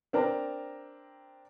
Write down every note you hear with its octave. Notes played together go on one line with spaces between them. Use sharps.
C4 D4 A#4 A#5